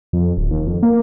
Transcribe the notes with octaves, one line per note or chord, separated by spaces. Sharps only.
F2
D1
D#2
F2
A#3